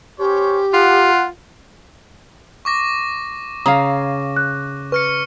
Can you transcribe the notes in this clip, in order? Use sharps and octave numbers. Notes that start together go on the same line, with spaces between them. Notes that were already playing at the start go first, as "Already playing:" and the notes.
C#4 G4 C5 C#5
F4 F#5
C#6 D6 A#6
C#3 F5 A#5 D#6
F#6
B4 C#6 F6 C#7